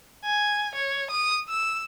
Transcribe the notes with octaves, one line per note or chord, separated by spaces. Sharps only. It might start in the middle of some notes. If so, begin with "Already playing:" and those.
G#5
C#5
D#6
E6